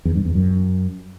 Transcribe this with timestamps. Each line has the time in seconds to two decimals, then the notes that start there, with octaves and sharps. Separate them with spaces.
0.05 E2
0.15 G2
0.25 E2
0.35 F#2